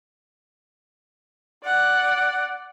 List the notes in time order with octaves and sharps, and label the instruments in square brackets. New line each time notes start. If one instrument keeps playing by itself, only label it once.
[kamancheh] D5 F#5